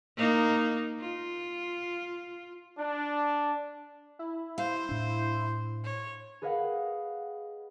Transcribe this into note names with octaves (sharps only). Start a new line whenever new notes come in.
A#3 D#4
F4
D4
E4
C5 F5
A2 D4
C#5
G#4 B4 D#5 F5 F#5